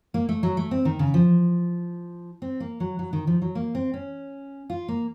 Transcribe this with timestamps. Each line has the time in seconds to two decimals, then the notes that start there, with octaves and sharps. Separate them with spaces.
0.14 A#3
0.29 A3
0.43 F#3
0.57 A3
0.71 C4
0.85 D#3
0.99 C#3
1.14 F3
2.42 C4
2.60 A#3
2.80 F#3
2.99 F#3
3.13 D#3
3.27 F3
3.42 F#3
3.55 A#3
3.75 C4
3.94 C#4
4.70 F4
4.88 A#3